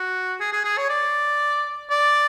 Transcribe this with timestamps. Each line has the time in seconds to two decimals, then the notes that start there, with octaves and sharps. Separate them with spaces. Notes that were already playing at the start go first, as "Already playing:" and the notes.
Already playing: F#4
0.40 G#4
0.52 G#4
0.64 G#4
0.78 C#5
0.89 D5
1.90 D5